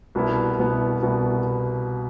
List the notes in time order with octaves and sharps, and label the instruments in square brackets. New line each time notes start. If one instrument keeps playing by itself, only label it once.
[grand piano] C2 B2 B3 E4
C2 B2 B3 E4
C2 B2 B3 E4